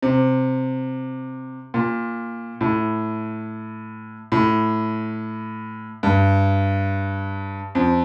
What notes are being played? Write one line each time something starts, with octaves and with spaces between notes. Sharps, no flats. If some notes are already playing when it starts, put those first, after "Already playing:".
C3
A#2
A2
A2
G2
F2